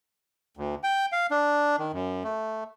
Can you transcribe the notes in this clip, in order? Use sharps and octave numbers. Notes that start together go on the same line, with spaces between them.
D2
G5
F5
D4
D#3
F#2
A3